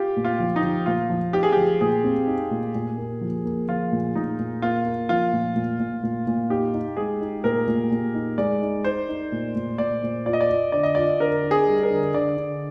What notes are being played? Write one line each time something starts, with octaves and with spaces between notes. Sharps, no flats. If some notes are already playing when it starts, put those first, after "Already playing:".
Already playing: F4 G4
A#2
F4
F3
D#4
F3
A#2 F4
F3
D#4 G4
G#4
F3 G4
A#2 G#4
C4
D#4
A#2
A#2
A#3
F3
A#3
F3 F4
A#2
A#2 D#4
A#2
A#3 F4
A#3
F3 F4
A#2
A#2
A#2
A#2
A#2
D#4 G4
D#4
G#3 G#4
D#4
A#2 A#4
A#2
A#2
D#4
G#3 D5
D#4
D#4 C5
D#4
A#2
A#2
A#2 D5
A#2
F4 D5
D#5
D5
F4
D3 D5
D#5
F4 D5
D3 A#4
D4
G#4
G3
A#4
D3
D3 D5
D3